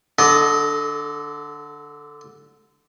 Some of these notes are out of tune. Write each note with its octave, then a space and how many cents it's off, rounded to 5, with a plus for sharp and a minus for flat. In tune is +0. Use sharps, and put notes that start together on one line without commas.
D3 +0 A4 -35 D#5 +0